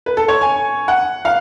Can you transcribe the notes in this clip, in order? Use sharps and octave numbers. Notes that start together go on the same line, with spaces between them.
B4
A4
C#5
G#5
F#5
F5